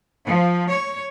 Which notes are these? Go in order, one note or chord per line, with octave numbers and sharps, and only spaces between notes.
F3
C#5